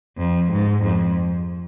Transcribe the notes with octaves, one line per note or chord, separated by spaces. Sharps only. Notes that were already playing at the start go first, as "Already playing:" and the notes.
F2
G#2
F2